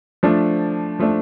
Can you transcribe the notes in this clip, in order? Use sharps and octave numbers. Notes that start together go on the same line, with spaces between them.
F3 A3 D4
F3 A3 D4